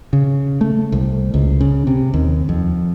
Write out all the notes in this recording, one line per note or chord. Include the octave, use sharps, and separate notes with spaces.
C#3
A3
C2
C#2
C#3
C3
D#2
F2